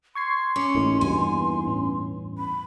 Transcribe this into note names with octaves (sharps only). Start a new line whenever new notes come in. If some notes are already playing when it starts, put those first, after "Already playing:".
C6 C#6 G#6 C7
C#4 C#6 D6 C#7
A1 A2 A#3 D#4 E4
E2 G2 B2 G#5
A2 C#4
B5